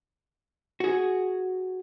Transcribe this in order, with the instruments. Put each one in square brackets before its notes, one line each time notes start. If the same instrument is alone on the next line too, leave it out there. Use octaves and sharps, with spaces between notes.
[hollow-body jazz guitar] F#4 G#4